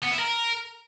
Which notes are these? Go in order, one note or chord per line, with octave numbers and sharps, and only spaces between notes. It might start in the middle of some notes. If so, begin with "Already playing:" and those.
B3
E4
A#4